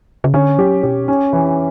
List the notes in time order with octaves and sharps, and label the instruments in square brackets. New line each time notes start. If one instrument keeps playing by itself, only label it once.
[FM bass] C#3
[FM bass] D3 [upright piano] C#4
[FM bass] F#3 [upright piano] G4
[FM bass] B2 [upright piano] G4
[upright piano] C#4
E3